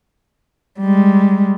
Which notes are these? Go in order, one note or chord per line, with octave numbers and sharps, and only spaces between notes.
G3 G#3